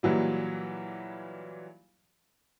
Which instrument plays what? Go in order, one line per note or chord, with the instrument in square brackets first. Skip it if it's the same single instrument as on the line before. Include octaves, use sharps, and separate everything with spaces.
[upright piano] A#2 E3 F#3 G3